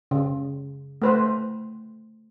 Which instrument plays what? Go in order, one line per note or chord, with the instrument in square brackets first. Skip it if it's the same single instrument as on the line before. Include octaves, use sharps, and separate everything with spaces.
[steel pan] C#3
A3 B4 C5